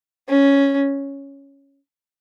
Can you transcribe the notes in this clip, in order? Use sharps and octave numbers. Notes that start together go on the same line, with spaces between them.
C#4